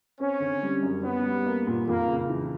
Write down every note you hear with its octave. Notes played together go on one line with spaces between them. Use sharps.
C4 C#4
D3
G3
F#2
B3 C#4
G3
A#3
A#2
F2 A#3
C#3
E3